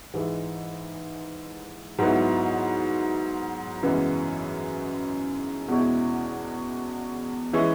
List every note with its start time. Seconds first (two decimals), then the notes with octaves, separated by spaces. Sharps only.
0.14 G#2 E3 G#3
1.99 G#2 F#3 B3 E4
3.83 F#2 C#3 E3 G#3 B3
5.68 E2 B2 G#3 C#4 E4
7.53 E3 G#3 C#4 E4